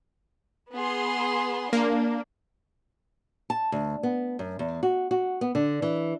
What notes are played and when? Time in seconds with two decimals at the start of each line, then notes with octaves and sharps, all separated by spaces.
0.74 B3 G#4 C6
1.73 A#3 D4
3.50 A5
3.72 D2
4.03 B3
4.39 F#2
4.59 E2
4.83 F#4
5.11 F#4
5.41 B3
5.55 D3
5.82 E3